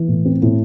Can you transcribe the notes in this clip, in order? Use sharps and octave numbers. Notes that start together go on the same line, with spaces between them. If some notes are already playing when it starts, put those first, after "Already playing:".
Already playing: E3
A2
C4
A2